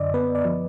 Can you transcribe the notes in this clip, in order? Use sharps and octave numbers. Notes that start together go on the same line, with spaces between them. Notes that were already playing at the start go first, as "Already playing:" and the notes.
Already playing: F#2 D3 D5 D#5
B3 B4
D5
F3